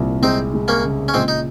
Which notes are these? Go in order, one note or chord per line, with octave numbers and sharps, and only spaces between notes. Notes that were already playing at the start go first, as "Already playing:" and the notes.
Already playing: C2 A#2
G#3 C4 D#4
G#3
A#3 C#4
C#3
C#4
A#2 G#3 C4
D#4